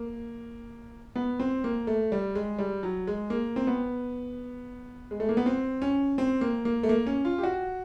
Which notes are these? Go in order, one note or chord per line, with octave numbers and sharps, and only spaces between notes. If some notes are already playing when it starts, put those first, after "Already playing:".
Already playing: A#3
B3
C4
A#3
A3
G3
G#3
G3
F#3
G#3
A#3
C4
B3
G#3
A3
A#3
B3
C4
C#4
C4
A#3
A#3
A3
A#3
C#4
F4
G4
F#4